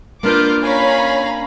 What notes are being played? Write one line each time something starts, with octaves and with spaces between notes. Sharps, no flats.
A#3 D4 F4 A#4 B4 F5 D6 G6
C#4 C#5 F5 G#5 A#5 B5